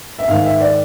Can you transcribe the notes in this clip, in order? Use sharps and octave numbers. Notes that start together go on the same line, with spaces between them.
E5
G#2 D#3 G#3 F5
E5
D5